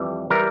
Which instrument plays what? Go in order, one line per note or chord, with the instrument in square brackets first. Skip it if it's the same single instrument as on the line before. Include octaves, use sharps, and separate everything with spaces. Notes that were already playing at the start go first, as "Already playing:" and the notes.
Already playing: [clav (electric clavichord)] F2 E3 G3
E3 G3 A#4